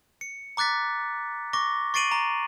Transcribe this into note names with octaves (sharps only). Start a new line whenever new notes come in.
C#7
A#5 D6 F#6 A6 B6
C#6 D6 A#6
C#6 A6 C7 D7 D#7 F#7
A#5